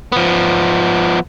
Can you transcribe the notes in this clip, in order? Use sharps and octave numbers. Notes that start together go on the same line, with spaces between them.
F3 B3